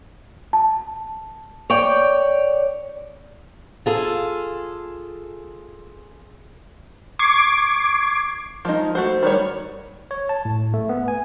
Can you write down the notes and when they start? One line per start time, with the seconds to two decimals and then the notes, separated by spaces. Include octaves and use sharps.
0.53 A5
1.70 C#5 D5 G5
3.86 F4 G#4 A4
7.19 C#6 D6 G#6 C7 D7
8.65 F3 G#3 D#4
8.95 A3 F#4 C5
9.23 D#3 G3 C#5
10.11 C#5
10.29 A5
10.45 A2
10.74 A3
10.89 B3
11.08 G#5